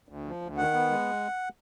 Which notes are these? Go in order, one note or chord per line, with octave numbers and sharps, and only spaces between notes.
D2
F3
D2
D#3 F#5
B3
G#3